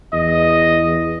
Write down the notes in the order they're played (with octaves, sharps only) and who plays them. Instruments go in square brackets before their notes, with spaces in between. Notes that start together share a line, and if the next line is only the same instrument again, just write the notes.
[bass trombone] E2 [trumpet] D#5